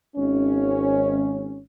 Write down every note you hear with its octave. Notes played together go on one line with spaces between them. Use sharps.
G#1 C#4